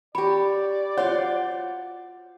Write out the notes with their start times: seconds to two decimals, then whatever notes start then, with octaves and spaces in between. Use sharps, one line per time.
0.15 G4 C#5 D5 B5
0.98 F4 C5 C#5 F5 F#5